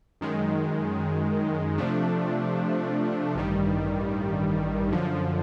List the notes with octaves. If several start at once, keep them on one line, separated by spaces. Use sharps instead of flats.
F#2 D#3 G#3
C3 F3 A3 D4
A1 G2 D#3 G3
F#2 D3 F3